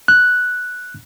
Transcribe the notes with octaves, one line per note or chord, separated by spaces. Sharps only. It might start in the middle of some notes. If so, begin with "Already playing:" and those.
F#6